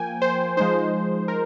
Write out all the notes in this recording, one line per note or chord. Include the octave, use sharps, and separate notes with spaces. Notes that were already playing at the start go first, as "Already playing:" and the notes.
Already playing: F3 A#3 G5 G#5
C5
F3 G#3 D#4 C5
A#4